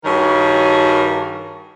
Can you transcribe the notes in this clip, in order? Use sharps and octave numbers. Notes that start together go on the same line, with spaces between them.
G2 D#3 F#4 G#4 A#4 C#5